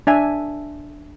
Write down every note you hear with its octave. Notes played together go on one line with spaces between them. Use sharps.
D4 E5 G#5